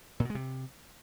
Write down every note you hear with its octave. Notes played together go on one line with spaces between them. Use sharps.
A#2
B2
G#3
C3